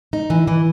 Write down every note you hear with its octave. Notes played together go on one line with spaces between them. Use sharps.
D#4
E3
E3